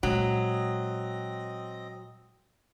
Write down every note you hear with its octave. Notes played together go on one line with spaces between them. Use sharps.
A#2 F#3 G#3 C4 D#5